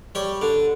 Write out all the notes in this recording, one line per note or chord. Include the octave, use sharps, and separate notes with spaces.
G3 C#5
D3